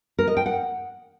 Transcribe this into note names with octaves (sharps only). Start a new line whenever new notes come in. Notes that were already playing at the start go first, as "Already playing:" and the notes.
A#4
D#5
G5
F#5